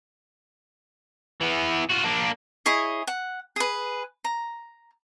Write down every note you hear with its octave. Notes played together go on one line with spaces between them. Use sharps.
E3 B3
F4 F#4
A#3 D4
E4 G#4 C#5 D#5
F#5
G#4 B4
A#5